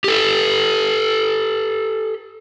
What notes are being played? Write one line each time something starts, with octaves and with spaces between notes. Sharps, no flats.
G4 A4